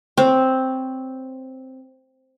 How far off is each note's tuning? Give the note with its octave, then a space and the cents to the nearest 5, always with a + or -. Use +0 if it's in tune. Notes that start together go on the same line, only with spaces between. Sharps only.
C4 +0 C#5 +0